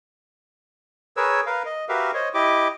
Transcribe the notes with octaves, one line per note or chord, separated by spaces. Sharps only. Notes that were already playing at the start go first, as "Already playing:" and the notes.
G#4 A#4 B4 C#5 E6
A#4 B4 F5
D#5
F#4 G4 A#4 B4 E5 F5
C5 C#5 D#5
E4 G4 D#5 D6